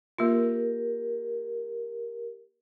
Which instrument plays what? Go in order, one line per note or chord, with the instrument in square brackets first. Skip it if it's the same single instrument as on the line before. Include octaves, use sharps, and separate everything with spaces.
[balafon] A#3 F4 [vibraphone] G4 A#4